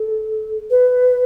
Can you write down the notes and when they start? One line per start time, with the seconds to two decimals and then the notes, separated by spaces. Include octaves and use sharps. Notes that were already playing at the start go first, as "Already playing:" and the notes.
Already playing: A4
0.71 B4